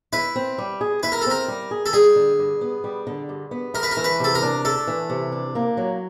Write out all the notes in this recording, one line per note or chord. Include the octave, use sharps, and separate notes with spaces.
E4 B4
C4
G3
G#4
E4 B4
A#4
A4
C4 A#4
G3
G#4
A4
G3 G#4
D3
G2
B3
G3
D3
G2
B3
A3 A#4
B4
A#4
E3
B4
C3 A4
A#4
D4
A3 A4
E3
C3
D4
A#3
F#3